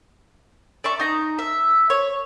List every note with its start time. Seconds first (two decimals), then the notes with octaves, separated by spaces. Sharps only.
0.84 D5 E5 C#6
1.00 D#4 A#5
1.39 E5
1.90 C#5